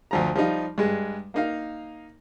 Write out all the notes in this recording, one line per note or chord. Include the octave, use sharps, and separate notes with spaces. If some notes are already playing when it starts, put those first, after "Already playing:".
D2 F3 A#5
F3 G3 D#4 F4
G2 G#3
A#3 D#4 F5